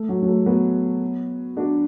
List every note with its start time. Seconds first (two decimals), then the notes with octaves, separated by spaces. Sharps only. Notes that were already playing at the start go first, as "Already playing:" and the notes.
Already playing: A3
0.09 F#3
0.22 F#3
0.27 A3
0.46 F#3 B3
1.57 D4 F#4